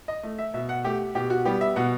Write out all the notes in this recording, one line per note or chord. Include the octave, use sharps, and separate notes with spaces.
D#5
A3
E5
B2 E5
F#5
A3 G4
B2 G4
F#4
G3 B3 G4
E5
B2 F#5